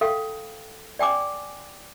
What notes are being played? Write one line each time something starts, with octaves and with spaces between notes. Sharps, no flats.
A4 F5 G5
D5 G5 G#5 D6